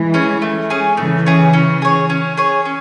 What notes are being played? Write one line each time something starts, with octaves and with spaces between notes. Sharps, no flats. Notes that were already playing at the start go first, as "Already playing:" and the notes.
Already playing: E3 G#3
C#4 G#4
A3
C#4 G#4
C#3 E3 A3
C#4 G#4
C#4
G#4 C#5
C#4
G#4 C#5
C#4